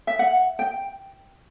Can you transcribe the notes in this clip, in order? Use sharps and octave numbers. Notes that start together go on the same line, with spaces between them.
E5
F#5
G5